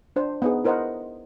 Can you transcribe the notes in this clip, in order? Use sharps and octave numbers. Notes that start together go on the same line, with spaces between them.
D4 C5
B3 D#4 G#4
E4 A#4 C5 D#5 F#5